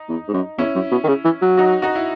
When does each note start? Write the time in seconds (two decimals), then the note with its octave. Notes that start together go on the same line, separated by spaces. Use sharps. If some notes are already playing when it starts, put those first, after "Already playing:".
Already playing: D#4
0.09 E2
0.28 G#2
0.33 F#2
0.58 E2 C#4 E4
0.75 F#2
0.91 B2
1.04 D#3
1.08 C#3
1.25 E3
1.42 F#3
1.57 D#4 F#4
1.82 D#4 F#4
1.96 E4